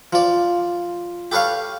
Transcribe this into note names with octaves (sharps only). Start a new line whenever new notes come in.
F3 D5
G4 A4 B4 C#5 F5